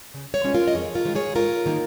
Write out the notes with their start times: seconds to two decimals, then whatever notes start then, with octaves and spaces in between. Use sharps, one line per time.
0.14 C#3
0.34 C#5 F5
0.44 G#3 C#4 F4
0.54 F4 A#4
0.67 D#5
0.74 F2 G#4 C#5
0.94 F4 A#4
1.05 D#3 G#3
1.15 G#4 C#5
1.35 G#2 F4 A#4
1.66 D#3 A#3 D#4